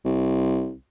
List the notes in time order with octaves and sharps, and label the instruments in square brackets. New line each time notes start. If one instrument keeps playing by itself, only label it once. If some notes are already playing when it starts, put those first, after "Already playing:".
[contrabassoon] C2